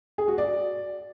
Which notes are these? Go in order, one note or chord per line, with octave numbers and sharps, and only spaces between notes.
G#4
F#4
D5